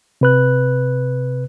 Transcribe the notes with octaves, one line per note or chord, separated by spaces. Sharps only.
C3 B4 F#6